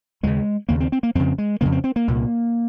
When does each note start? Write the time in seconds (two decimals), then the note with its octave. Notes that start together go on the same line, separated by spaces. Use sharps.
0.23 D#2 C#3 G#3
0.69 D#2 C#3 A#3
0.80 C4
0.92 C4
1.03 A#3
1.15 F2 C#3 C4
1.38 G#3
1.61 F2 C#3 A#3
1.72 C4
1.84 C4
1.96 A#3
2.08 C2 A#2